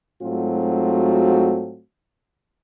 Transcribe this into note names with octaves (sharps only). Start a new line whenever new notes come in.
G#2 F#3 A3 C4 F4 F#4